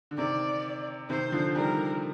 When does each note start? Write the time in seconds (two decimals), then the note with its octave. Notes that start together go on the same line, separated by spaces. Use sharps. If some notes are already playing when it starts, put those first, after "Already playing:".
0.11 D3
0.17 C3 D#3 D5
1.09 C3 D#3 C5
1.32 D3 F3
1.55 D#3 G3 A#4